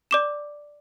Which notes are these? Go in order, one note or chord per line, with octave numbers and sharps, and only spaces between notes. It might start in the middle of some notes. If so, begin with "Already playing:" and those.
D5 D6 E7